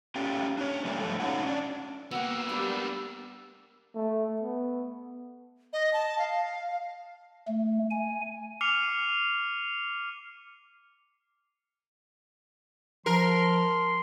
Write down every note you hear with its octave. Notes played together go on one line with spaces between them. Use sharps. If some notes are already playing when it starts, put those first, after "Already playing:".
A3 C#4 F4 G4 G5
D4 C#5
C3 F#3 G3 A3 A#3 D4
F2 G#2 A3 A4
F#3 C#4 D#4 F4 C#5 F#5
C#4 D4
A#3 B3 F#4 G4 E6
G3 D4 B5 C6
A3
B3
D#5
A5
F5
A3
G#5
D6 F6 C7 C#7 D#7 F7
F3 A#4 C6